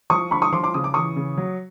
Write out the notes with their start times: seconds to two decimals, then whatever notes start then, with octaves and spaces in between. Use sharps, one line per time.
0.10 F3 C#6 D#6
0.31 D3 B5 C#6
0.42 C#6 D#6
0.52 F3 C6 D6
0.63 C6 D6
0.74 C#3 D#6
0.84 D6
0.94 E3 C#6 D#6
1.16 C#3
1.38 F#3